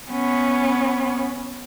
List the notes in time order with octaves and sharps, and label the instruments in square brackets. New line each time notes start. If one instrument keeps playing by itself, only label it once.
[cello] B3 C#4